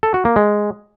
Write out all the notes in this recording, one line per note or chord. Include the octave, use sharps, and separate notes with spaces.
A4
F#4
A#3
G#3